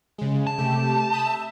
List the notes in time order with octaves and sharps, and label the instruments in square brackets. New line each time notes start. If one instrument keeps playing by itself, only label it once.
[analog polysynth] C#3 G#3
[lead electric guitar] A5
[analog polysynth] C3 A3 G4
B5 D#6 G6
E5